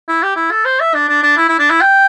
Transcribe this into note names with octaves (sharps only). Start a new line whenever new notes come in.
E4
G4
E4
A4
C5
E5
D4
D4
D4
E4
E4
D4
E4
G5